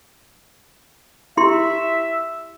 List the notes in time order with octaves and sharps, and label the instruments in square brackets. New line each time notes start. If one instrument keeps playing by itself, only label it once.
[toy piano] E4 G4 C6 [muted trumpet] E5